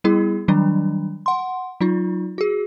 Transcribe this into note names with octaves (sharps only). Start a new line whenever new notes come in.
G3 B3 E4 G#4
D#3 F#3 G3 D4
F#5 C6
F#3 D#4 F4
F#4 G#4